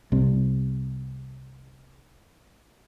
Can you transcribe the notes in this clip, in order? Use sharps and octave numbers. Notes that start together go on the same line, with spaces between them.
C2 C3